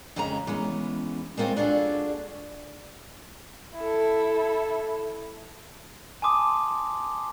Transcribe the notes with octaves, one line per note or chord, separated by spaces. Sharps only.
F2 C#3 G#3 C#4 A#5
E3 G#3 B3 C#4
G#3 A#3 C4 F4 C5 C#5
D4 F4 F#4 G#4 A4
E4 A4
G#5 A5 C6 D6 D#6